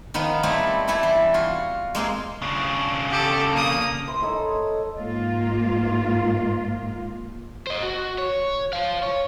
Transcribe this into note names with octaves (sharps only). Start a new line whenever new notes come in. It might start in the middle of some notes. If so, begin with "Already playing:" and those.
D#3 F3 B3 D#4
G3 A3 B3 C4 E4 A4
G3 A3 E4 A4 G#5
E3
F4 F#4
G#3 A#3 C4 G#4
C#3 D4
G4 A4
A#3 D#6
C5 E5 B5
D#4 A4 C#5 E5
G#2 A#3 F4
C5 D#5
F#4
C#5
C5 F5
C#5